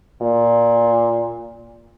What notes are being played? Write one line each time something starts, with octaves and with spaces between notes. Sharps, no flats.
A#2